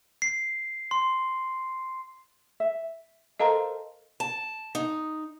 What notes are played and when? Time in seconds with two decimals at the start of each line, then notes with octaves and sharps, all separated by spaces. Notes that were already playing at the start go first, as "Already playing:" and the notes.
0.22 C7
0.91 C6
2.60 E5
3.40 A4 A#4 C5 D#5 F5 A#5
4.20 A5
4.75 D#4